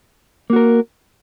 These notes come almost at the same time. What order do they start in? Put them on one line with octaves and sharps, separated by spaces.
A#3 F#4 A#4